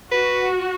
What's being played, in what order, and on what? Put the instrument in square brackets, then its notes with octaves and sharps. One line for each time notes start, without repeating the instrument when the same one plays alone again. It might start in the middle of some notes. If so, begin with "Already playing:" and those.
[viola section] F#4 [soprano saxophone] B4